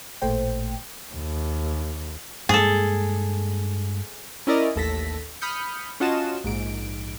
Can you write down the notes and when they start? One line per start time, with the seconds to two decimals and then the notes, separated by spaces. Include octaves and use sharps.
0.22 A1 A#2 A3 C5 G5
1.13 D#2
2.49 G2 G#3 A#3 G#4 A4
4.47 C#4 E4 A#4 D5 D#5
4.76 A1 D#2 A4 A#6 B6
5.41 B5 D#6 F6 G6 C#7
6.00 C#4 F4 F#4 D#5 A5 E7
6.44 A#1 G#2 D7